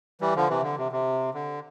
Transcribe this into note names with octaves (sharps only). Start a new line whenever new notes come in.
E3 G3
D3 F3
C3 E3
D3
C3
C3
D3